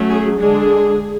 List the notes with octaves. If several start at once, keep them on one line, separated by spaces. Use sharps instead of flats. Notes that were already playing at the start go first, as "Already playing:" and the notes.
Already playing: F#3 A3 C#4
G#4
D3 G#3 D4 G#4